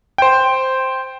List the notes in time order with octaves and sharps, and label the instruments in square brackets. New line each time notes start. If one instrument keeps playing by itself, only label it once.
[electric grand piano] C5 G5